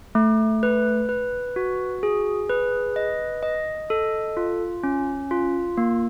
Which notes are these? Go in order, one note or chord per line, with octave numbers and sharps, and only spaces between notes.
A3
B4
B4
F#4
G#4
B4
D#5
D#5
A4
F4
C#4
F4
A#3